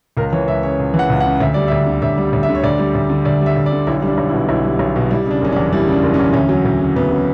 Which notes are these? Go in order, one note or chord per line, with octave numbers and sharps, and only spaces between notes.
C#2 A#4
E3 C#5
C#2 E5
C#3 C#5
C#2
E3
F#5
C#2
F#5
C#3
D2 E5
G3 D5
D2 E5
D3
D2 E5
G3
D2
E5
D3
C#5
D2 D5
G3
D2
D3
D2 D5
G3 E5
D2
D5
D3
B1 E4
G3
D4
B1
E4
B2
B1 E4
G3
B1
B2
G3 E4
C#3 D4
F#1 C#4
D4
E2
G3 E4
C#3
D4
F#1
C#4
E2
D2 C#4
F#3
D2
C#3
D2 B3
F#3 C#4